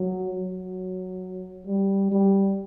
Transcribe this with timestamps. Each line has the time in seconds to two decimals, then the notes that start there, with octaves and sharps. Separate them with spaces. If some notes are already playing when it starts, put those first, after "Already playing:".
Already playing: F#3
0.30 F#3
1.66 G3
2.12 G3